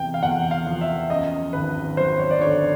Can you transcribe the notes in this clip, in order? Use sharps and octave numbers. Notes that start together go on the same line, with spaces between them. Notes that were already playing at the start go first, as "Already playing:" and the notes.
Already playing: E2 C3 G5
F5
E2 F#5
F5
F3
E5
F#2 D#5
G#1 B4
F#3 C5
C#5
D5
D3 C#5